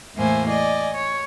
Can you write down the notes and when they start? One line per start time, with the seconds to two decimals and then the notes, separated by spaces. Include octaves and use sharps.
0.15 E2 A2 A#3 E4 C5 G#5
0.47 D5 D#5 G#5
0.93 C#5